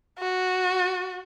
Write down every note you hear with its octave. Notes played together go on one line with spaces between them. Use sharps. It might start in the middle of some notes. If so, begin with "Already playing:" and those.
F#4